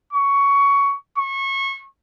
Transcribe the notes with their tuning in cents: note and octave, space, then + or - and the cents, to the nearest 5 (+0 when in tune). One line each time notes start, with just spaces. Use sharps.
C#6 +15
C#6 -25